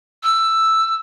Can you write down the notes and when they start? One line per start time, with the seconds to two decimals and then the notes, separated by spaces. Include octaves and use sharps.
0.23 E6